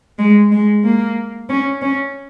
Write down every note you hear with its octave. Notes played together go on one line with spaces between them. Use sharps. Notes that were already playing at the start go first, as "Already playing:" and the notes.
G#3
G#3
A#3
C#4
C#4